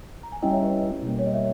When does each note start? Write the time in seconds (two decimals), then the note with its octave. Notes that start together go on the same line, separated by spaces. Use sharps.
0.23 A#5
0.32 G#5
0.42 G3 C#4 E4 D#5 G5
0.52 C#5 E5
0.62 B4 D#5
1.02 B2 G3 A#3
1.19 C#5
1.26 D#5
1.33 C#5 E5